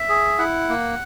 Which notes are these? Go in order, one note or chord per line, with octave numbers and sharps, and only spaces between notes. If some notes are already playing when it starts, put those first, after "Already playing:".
Already playing: E5
G#4
E4 F#5
A#3